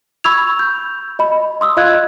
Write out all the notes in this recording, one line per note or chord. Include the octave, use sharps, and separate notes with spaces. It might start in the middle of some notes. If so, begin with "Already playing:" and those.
B5 C#6 E6 G#6 F7
G6
D#5 B5
C6 D#6 E6
F4 D#5 F5 F#6 G#6